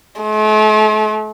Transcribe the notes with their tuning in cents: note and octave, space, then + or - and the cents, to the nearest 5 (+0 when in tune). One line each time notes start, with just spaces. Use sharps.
A3 -45